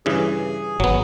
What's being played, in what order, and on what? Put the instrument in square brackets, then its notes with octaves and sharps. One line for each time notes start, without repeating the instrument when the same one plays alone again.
[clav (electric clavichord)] G2 C#3 E3 [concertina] G#4
[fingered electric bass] G#1 [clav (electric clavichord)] F#3 B3